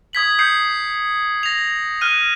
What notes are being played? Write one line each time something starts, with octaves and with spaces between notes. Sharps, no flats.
D#6 G#6 B6 F#7
D#6 G6 C7 C#7
A#6 F7
F6 F#6 D#7